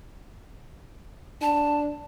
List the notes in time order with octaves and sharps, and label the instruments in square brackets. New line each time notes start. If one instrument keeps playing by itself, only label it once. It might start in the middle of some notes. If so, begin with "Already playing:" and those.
[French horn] D4 [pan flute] A5